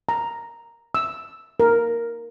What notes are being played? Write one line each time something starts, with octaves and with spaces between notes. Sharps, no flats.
A#5
E6
A#4